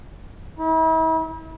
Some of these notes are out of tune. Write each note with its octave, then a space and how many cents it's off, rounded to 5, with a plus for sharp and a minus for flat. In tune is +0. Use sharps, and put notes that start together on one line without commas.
E4 -45